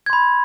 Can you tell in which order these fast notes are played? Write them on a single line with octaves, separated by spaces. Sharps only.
G#6 C6 B5